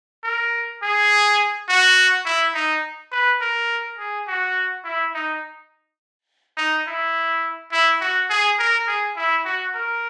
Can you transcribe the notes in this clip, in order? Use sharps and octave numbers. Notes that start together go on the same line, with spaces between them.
A#4
G#4
F#4
E4
D#4
B4
A#4
G#4
F#4
E4
D#4
D#4
E4
E4
F#4
G#4
A#4
G#4
E4
F#4
A#4